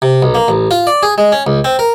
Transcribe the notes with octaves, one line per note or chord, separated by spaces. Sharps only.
C3
B1
A#3
A1
F4
D5
G#4
G#3
C#4
C#2
C4
A#4